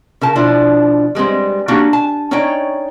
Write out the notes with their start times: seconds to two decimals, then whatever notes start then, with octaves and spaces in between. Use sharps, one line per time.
0.21 C#3 A#4 A5
0.36 B2 F3 D4 E4
1.15 G3 G#3 B3 C4
1.68 A#3 C#4 D4 F#4 G4
1.93 G#5 A5
2.31 C#4 D#4 C#5 D5 G5